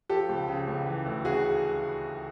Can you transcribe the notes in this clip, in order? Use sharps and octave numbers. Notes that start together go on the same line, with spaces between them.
F3 G4 A4
C#2
C#3
C#2
E3
D2
C#3 F#4 G#4